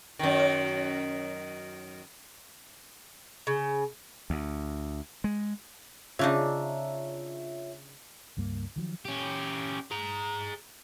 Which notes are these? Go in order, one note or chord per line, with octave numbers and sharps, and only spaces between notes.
F#2 D#3
C#3
D2
G#3
C#3 D4 D#4 F4 C#5 E5
C#2 G2 G3 A#3
D#3 F3 F#3
C#4 G4
G#4 A#5